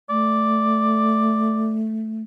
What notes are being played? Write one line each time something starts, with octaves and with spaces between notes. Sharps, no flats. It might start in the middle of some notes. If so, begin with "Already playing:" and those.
A3 D5